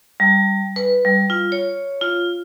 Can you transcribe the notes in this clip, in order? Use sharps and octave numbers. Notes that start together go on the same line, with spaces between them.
G3
B4
G3
F4
C#5
F4